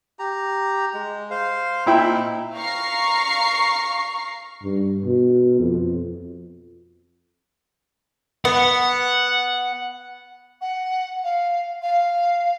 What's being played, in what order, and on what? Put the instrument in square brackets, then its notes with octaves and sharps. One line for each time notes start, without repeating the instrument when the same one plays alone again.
[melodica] G4 A#5
G#3
C5 F5
[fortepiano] A#2 E4 G5 [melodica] C4 D#4
[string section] F5 A#5 C#6 C7
[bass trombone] G2
B2
F2
[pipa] B3 [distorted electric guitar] F#5
[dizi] F#5
F5
F5